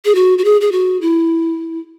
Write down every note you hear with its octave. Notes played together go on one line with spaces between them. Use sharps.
G#4
F#4
F#4
G#4
G#4
F#4
E4